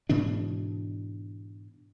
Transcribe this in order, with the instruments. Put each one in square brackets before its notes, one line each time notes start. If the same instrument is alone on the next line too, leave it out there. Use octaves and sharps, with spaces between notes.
[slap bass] G#2 B2 E3 D4